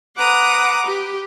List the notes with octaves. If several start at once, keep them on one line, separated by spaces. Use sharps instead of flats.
B4 F#5 A#5 D6 D#6
G4